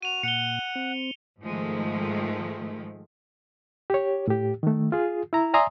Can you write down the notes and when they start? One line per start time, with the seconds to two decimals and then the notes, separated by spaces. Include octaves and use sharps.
0.02 F#4 D#7 F7
0.23 A#2 F#5 C#7 G7
0.75 C4
1.43 G#2 D#3 F3 G#3 A3
3.90 G4 C#5
4.28 A2 G4
4.63 D#3 A3
4.92 F4 G#4
5.33 E4 A#5
5.54 D5 E5 G#5 A#5 C6 D#6